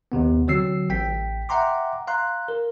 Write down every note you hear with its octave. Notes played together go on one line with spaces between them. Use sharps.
D#2 C3 B3
D3 F#3 C4 E6 C7
A1 G5 B6
E5 F#5 G5 A#5 C6 D6
F5 A#5 C6 F#6
A#4